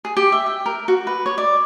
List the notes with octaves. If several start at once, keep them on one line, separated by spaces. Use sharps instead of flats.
G#4
G4
E5
G5
A#4
F#4
B4
C#5
D5